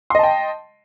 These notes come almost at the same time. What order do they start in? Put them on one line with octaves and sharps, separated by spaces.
C6 D#5 A5 G5